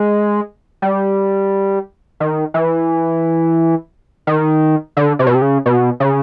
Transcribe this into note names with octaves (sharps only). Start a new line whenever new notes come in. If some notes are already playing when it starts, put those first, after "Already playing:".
Already playing: G#3
G3
D#3
E3
D#3
D3
C3
B2
C3
C#3
B2
C#3